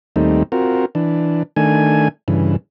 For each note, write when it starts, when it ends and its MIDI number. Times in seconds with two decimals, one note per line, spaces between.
0.16 0.43 39
0.16 0.43 55
0.16 0.43 57
0.16 0.43 60
0.16 0.43 63
0.52 0.85 60
0.52 0.85 65
0.52 0.85 66
0.52 0.85 70
0.95 1.43 52
0.95 1.43 62
1.56 2.08 51
1.56 2.08 57
1.56 2.08 62
1.56 2.08 80
2.28 2.56 43
2.28 2.56 49
2.28 2.56 52